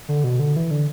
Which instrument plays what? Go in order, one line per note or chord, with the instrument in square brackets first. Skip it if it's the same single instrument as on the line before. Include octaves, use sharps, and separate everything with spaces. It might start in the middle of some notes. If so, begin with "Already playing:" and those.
[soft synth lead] D3
B2
D3
E3
D3